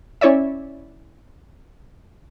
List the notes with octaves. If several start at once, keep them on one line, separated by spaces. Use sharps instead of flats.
C#4 E4 C#5 D5 E5